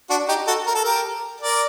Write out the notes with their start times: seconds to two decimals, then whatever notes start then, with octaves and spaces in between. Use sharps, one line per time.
0.10 D4 F#4
0.28 D#4 G4
0.47 F#4 A4
0.67 A#4
0.75 A4
0.84 G4 A#4
1.41 A#4 D5